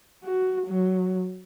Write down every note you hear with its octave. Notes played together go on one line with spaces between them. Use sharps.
F#4
F#3